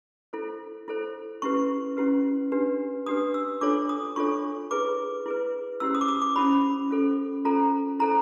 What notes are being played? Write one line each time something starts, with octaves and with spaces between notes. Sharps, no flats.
E4 A4 C5
E4 A4 C5
C#4 E4 G4 B4 C#6
C#4 E4 G4 B4
D4 G4 B4
D4 G4 B4 D#6
E6
D4 F4 A4 C#5 D6
D#6
D4 F4 A4 C#5 C#6
E4 G#4 B4 D6
E4 G#4 B4
C#4 E4 G4 C5 E6
D#6
D6
D#6
D6
C#4 E4 G4 C5 B5
C#4 F4 A4 C5
C#4 F4 A4 C5 A#5
E4 A4 C5 A#5